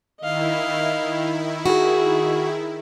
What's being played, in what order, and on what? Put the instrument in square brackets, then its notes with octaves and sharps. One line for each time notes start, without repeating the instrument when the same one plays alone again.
[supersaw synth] D#3 E4 [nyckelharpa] D#5 F5
[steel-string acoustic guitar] F#4 [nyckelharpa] G#4